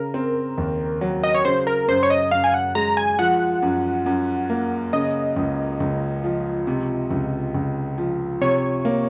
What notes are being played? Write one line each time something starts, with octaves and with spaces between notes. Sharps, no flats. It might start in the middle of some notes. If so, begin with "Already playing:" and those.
Already playing: C#3 A#4
C4
D#2
F#3
D#5
C#5
C#3 C5
A#4
F#2 C5
C#5
D#5
F#2 F5
G#5
F#5
G#3 A#5
G#5
F3 F#5
F#2
F#2
A#3
C#3 D#5
C#2
C#2
F3
C3
C#2
C#2
F3
C3 C#5
A#3